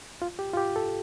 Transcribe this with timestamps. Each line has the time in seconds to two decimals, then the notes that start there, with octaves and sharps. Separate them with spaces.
0.22 F4
0.39 G4
0.53 F4
0.57 G4
0.76 A4